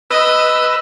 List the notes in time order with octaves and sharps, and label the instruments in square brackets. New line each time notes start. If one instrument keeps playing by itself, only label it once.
[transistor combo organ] B4 E6 [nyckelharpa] D#5